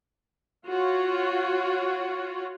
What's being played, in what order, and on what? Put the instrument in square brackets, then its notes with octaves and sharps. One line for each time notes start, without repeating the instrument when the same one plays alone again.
[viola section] F4 F#4 C#5